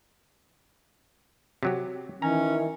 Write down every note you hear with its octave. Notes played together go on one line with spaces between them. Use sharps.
C3 F#3 G4
D#3 E3 C#4 A#5